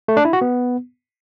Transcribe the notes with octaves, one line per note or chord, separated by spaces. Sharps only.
A3
D4
E4
F#4
B3